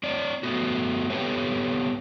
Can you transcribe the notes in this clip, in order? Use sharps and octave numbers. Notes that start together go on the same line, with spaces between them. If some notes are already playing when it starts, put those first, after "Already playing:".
C4 C#5 D5
A3 B3 F#4
B3 C4 G4 A4 B4 C#5